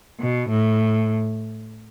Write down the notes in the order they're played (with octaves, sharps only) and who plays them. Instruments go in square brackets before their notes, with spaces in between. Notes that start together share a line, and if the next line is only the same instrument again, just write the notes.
[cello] B2
A2